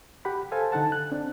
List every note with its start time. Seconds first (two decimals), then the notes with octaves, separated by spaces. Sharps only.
0.25 G4 F#5 B5
0.52 A4 C5 F5 G#5
0.72 D3 D#4 A4 F#5 A5
0.92 F#6
1.11 C4 D4